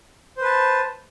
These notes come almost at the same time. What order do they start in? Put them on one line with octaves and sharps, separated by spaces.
C5 B4 A5